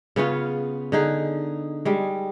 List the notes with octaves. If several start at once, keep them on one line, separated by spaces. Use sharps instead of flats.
C#3 B3 C#4 F4
D3 D#4 G#4
G3 G#3